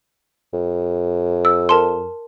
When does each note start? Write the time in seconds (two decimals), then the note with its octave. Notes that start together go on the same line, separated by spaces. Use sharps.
0.53 F2
1.45 E6
1.69 A#4 A5 C6